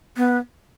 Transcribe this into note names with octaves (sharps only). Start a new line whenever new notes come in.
B3